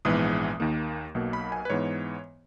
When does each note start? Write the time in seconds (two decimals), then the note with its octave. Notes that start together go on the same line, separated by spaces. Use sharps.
0.05 A#1 G#2 E3 G#3 B3 D#6
0.60 D#2 D#3 A#3
1.15 B1 B2 A#3
1.33 B5
1.52 G#5
1.65 B4
1.70 G#2 E3 B3 C#5